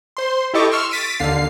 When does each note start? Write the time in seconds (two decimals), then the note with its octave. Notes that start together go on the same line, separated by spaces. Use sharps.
0.17 C5 C6
0.54 E4 G4 A4 D#5 C#6 D6
0.71 C6 C#6 E6 F6
0.91 A6 B6 D7 D#7
1.19 D#2 D3 F5 C7